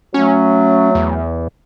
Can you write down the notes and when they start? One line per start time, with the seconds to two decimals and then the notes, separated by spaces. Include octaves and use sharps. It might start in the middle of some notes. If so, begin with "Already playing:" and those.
0.14 F#3 A3 C#4
0.95 E2